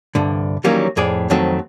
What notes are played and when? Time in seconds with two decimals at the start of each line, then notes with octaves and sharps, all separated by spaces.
0.15 C2 G2 D3
0.64 D#3 E3 F#3 G3 A#3 C#4
0.97 F2 A2 G#4 D5
1.30 F2 D#3 F#3 A3 C4